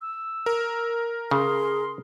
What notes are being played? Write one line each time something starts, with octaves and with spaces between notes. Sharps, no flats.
E6
A#4
C#3 G#4 C6